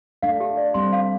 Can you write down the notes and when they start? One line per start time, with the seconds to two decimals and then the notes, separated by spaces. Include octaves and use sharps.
0.23 A3 D4 F5
0.40 G4
0.57 D5
0.74 G3 C4 C6
0.93 F5